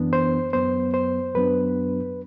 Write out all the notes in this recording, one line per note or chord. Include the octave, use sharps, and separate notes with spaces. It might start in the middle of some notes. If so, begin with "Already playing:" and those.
Already playing: F#2 E3 B3 D4
C5
F#2 F#3 B3 C5
C5
F#2 F#3 B3 D4 B4